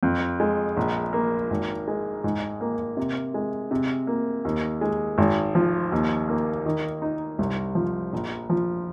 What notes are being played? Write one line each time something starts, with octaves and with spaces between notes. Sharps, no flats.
F2
G#3
A#1
A#3
G#1
G#3
G#2
A#3
C3
G#3
C3
A#3
D#2
G#3
G#1
F3
D#2
A#3
D#3
D#4
C2
F3
A#1
F3